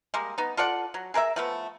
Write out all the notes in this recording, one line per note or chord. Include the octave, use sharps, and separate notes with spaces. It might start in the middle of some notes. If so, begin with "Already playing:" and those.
G3 G#3 A#3
B3 D#4
F4 A4 D5 F#5
F#3
G#4 A#4 B4 E5
F3 A3 B3